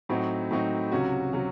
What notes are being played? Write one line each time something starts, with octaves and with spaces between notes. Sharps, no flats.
A2 F#3 C4 D#4 F#4
A2 F#3 C4 D#4 F#4
C#2 C3 F#3 C#4 F#4
C3 F#3 C#4 F#4